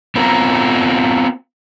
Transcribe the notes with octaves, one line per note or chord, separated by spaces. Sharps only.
B3 C4 F4 A#4